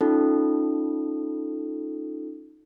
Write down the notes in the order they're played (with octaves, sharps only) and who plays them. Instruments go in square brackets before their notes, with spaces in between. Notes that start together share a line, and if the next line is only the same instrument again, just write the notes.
[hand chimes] C#4 D#4 F4 A4